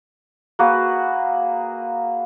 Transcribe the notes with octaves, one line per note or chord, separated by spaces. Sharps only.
A#3 F#4 G#4 B4